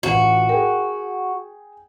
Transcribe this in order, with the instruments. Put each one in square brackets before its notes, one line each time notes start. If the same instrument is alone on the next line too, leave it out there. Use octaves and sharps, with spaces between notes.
[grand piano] A1 F4 [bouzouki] F#4
[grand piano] G#4 G5 [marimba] A#4